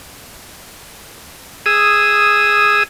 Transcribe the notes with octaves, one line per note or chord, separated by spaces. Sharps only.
G#4 D#6 E6